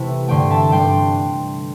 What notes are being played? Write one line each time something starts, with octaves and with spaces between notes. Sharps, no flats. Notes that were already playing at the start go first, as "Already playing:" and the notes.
Already playing: C3 E3 A3 E4
G2 D3 A3 C4 G5 C6
E5 A5
G2 G3 D4 G5 C6